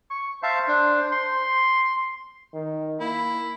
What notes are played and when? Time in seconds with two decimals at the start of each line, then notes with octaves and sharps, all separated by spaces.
0.11 C#6
0.43 C5 E5 F5 A5
0.68 D4
1.12 C6
2.54 D#3
3.00 A#3 E4